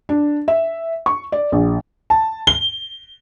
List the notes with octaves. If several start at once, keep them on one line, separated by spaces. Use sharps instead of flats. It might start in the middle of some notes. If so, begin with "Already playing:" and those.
D4
E5
C#6
D5
A#1
A5
G7